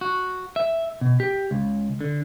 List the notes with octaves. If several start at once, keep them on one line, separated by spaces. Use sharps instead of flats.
F#4
E5
B2
G4
C#2
D3